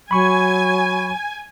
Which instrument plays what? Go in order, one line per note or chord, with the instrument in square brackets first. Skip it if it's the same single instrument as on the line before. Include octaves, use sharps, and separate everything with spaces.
[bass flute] F#3 [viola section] G#5 [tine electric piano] B5 C#6